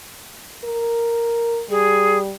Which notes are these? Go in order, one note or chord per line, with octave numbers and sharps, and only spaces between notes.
A#4
G3 G#4